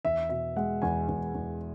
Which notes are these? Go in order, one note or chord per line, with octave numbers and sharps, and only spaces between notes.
E2 E5
B2 E5
G#3 F#5
E2 G#5
E2
E2